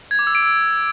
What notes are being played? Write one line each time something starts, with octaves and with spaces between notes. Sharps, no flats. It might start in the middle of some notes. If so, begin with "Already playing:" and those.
G#6
D6
E6
D7
E6